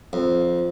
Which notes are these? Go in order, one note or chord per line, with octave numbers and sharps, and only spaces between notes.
F2